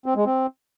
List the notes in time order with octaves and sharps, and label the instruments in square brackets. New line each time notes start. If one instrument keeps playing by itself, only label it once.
[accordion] C4
G#3
C4